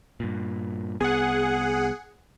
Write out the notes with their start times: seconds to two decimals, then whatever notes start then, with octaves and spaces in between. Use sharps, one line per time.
0.20 G2 A#2
1.00 C2 B3 G#4 F#5